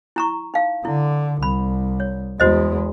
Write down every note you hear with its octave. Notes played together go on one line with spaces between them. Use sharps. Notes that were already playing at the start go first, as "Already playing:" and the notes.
E4 A#5 C#6
D#4 F5
D3 E4
C2 B5
C#5
E2 G#3 F#4 C5 D#5